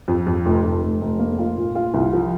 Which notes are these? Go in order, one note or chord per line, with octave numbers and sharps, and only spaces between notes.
F2
F2
F1
F1
F1
F1
A#3
F4
A#2
F4
C2
F3